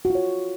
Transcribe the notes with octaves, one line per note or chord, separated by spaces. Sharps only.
F#4
F4
C#5